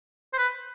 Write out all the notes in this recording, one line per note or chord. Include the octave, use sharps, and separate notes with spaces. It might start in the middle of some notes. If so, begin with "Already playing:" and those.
C5
B4